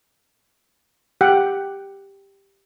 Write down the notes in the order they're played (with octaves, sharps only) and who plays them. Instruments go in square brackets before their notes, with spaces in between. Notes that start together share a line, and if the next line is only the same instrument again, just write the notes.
[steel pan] G4 F#5 G5